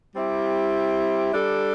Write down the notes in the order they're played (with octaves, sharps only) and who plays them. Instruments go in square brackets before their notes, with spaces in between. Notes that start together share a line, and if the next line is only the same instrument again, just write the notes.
[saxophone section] G3 C4 E4 G4
G3 D4 A4